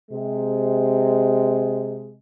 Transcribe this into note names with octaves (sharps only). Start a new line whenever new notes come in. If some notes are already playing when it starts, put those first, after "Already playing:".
C3 G#3